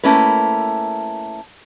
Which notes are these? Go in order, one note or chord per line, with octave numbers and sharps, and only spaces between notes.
A3 A#3 C#4 E4 B4